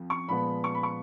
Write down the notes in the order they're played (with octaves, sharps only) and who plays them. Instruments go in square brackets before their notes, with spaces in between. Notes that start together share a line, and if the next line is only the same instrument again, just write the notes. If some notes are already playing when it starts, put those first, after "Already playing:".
Already playing: [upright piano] F2 F3
C#6
A#2 F3 G#3 B3 B5
C#6
B5
C#6